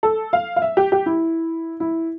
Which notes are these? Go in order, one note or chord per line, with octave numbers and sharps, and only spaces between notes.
A4
F5
F5
E5
G4
G4
E4
E4